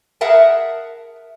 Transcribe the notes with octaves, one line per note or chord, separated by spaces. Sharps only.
G#4 A#4 E5 F#5 A5